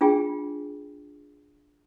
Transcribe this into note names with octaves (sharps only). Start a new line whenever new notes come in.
D4 F4 G#4 G5 G#5